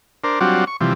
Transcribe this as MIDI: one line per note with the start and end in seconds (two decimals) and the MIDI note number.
0.24 0.39 62
0.24 0.39 70
0.24 0.39 72
0.40 0.65 54
0.40 0.65 55
0.40 0.65 60
0.40 0.65 62
0.40 0.65 65
0.40 0.65 66
0.67 0.77 85
0.81 0.93 48
0.81 0.93 52
0.81 0.93 53
0.81 0.93 55